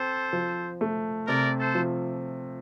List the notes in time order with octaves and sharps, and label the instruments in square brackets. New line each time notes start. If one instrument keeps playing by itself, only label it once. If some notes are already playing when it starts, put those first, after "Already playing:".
Already playing: [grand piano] C4 [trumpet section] A4 C5
[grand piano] F3
A3
[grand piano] C3 [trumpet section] A#4 D5
[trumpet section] A4 C5
[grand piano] F3